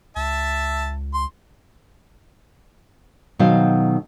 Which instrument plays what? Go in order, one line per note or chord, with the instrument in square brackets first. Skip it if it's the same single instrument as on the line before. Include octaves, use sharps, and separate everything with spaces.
[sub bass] C#2 [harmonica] E5 A5
[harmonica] C6
[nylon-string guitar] B2 D#3 F#3 A4 C5 F5